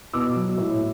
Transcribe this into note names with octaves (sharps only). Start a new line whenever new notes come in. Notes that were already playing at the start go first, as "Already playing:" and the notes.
B2 D6 E6
F#3
A2